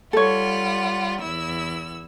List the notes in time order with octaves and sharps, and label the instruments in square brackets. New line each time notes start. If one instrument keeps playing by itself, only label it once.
[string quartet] G3 F4 F#5 [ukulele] A4 C#5
[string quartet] E2 E4 E6